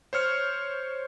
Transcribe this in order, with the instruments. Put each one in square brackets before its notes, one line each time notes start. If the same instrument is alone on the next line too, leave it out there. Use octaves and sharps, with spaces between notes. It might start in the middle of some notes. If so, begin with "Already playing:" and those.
[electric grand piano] C5 C#5 F6 C#7